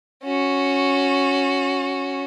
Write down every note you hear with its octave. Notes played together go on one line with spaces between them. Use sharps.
C#4 F#4